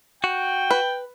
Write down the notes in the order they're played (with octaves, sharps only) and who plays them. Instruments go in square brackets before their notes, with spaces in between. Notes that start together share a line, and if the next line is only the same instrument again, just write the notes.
[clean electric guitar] F#4 [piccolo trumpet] G5
[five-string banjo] B4